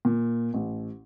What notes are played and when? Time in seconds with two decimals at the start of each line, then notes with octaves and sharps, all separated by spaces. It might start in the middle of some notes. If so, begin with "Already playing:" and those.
0.05 A#2
0.54 A1